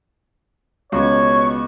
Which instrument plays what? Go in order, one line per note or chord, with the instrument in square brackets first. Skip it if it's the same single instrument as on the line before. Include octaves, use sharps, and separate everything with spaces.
[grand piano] C#2 [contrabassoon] B2 [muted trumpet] C#5 [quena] C#6